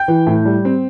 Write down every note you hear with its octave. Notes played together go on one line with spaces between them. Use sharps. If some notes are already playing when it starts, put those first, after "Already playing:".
Already playing: G5 G6
E3
A2
G3
C4